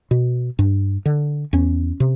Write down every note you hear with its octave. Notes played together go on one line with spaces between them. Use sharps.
B2
G2
D3
E2 C#4
C3